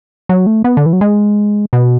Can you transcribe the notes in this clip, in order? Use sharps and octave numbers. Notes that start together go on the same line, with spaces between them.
F#3
A3
B3
D3
E3
F#3
G#3
B2